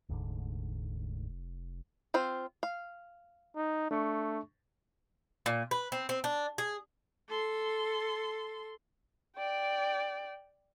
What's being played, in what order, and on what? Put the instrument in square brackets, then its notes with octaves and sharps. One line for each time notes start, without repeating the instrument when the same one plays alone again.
[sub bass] F1 [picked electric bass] D2 G#2 D3
[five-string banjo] C4 F4 C5
F5
[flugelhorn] D#4
[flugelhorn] A3 [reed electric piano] D4 C#6
[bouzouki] A#2
B4
C4
C4
D4
G#4
[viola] A4 C6
[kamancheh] D5 G5